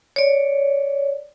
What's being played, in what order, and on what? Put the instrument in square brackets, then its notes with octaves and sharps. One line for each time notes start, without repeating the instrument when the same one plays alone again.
[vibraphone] C#5 D5